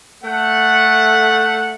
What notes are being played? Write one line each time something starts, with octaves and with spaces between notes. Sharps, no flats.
A3 F#5